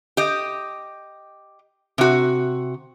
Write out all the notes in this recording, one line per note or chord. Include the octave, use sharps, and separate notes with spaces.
G4 D#5
C3 F#4